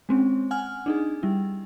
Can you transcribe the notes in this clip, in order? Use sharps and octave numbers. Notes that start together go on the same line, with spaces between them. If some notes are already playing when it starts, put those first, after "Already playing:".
G#3 C4 C#4
F#5 G#5 F6
D4 D#4 G#4
G3 E4